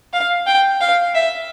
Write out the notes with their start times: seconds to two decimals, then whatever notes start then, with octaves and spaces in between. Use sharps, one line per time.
0.13 F5
0.47 G5
0.81 F5
1.15 E5